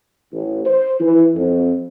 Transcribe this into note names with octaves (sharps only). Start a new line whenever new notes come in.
A1
C5
E3
F2